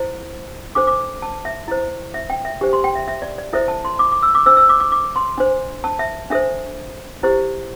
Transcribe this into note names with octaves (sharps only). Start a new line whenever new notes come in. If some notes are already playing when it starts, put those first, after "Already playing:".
Already playing: E4 C5
D4 A4 C5 D6
D6
A5
E5
E4 C5
E5
G5
E5
D4 G4 C5
C6
G5
E5
E5
D5
D5
E4 A4 C5 E5
A5
C6
D6
D6
E6
D6
D4 C5 E6
E6
D6
D6
D6
C6
D4 C5
A5
E5
D4 A4 C5 E5
E4 G4 C5